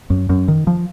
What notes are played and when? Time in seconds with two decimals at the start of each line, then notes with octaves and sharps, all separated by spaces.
0.10 F#2
0.29 F#2
0.48 D#3
0.67 F3